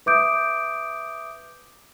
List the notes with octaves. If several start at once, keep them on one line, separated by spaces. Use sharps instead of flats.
B4 E5 D6 D#6 G6 D7